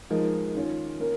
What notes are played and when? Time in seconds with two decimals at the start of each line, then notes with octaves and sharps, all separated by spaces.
0.10 F3 G#3 D#4 A#4
0.55 D#3 C#4 F4 C#5
0.99 A#3 C#4 A#4